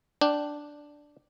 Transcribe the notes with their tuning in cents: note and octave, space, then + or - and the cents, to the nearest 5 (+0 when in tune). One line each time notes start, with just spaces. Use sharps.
D4 +0 G5 -10